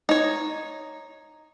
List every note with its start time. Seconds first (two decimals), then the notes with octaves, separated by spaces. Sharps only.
0.09 D#4 C#5